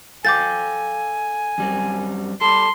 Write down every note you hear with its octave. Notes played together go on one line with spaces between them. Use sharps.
A4 F5 G5 G#5 D6 G6 A6
F#2 G3 C4
G3 A4 C6